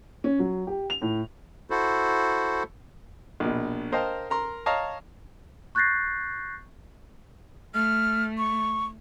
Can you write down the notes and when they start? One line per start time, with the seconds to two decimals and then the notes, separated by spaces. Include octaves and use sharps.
0.24 C#4
0.39 F#3
0.67 G4
0.90 F7
1.02 A2
1.70 E4 F#4 A4 C5
3.40 A#1 B2
3.92 A#4 C5 D#5 F5 G5 A5
4.30 A#4 A#5 C6
4.66 C#5 D#5 F5 A5 A#5
5.75 C#6 F#6 G6 A6 A#6 C7
7.74 A3 F6
8.38 C#6